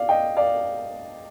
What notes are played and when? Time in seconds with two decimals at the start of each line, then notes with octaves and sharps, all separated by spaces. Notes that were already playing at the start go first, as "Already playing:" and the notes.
Already playing: D5 F5
0.09 D#5 G5
0.37 D5 F5